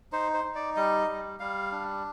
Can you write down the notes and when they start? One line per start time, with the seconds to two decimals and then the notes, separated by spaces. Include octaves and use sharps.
0.12 D#4 C5
0.34 C5
0.44 D#4
0.55 D5
0.76 G3 D#5
1.08 G3
1.40 G3 F5
1.72 D4